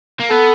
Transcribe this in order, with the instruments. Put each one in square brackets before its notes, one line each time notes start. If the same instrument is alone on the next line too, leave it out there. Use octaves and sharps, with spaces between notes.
[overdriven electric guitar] A#3
[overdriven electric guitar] B3 [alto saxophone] A4